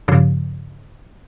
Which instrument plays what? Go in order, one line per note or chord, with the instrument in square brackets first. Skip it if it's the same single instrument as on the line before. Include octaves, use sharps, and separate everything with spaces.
[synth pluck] G2 C#3 F3